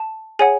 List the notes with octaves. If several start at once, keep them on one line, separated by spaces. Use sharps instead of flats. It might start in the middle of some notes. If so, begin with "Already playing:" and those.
Already playing: A5
G#4 C#5 F#5 G#5